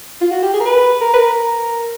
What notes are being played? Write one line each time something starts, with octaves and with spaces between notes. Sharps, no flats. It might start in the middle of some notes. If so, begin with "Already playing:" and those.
F4
F#4
G4
G#4
A#4
B4
A#4
B4
A#4